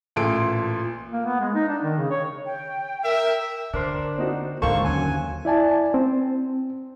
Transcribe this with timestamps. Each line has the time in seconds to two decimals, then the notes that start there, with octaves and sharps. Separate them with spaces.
0.16 A1 A#2 A4 A5 C6 D7
1.11 A#3
1.25 B3
1.40 G#3
1.54 D#4
1.68 D4
1.83 D#3
1.97 C#3
2.10 C#5
2.46 G5
3.04 A#4 E5
3.74 D3 D4 A#4 C5
4.18 C4 D#4 F#4
4.62 D#2 G#2 D3 A#3 A4 C5 G5 C#6
4.85 F#2 F#3 G#5
5.45 E4 D5 G#5 A5
5.94 C4